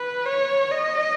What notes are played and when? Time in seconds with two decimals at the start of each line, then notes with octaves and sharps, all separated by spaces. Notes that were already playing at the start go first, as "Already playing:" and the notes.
Already playing: B4
0.26 C#5
0.71 D#5